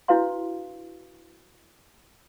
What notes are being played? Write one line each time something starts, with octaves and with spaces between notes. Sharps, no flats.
D4 E4 F#4 B4 F5 C6